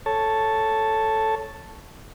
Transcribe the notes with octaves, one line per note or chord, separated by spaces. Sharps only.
A4 C#5 A5